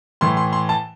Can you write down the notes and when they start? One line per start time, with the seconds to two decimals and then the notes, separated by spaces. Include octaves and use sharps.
0.21 A2 E3 C6
0.37 C6
0.53 C6
0.69 A5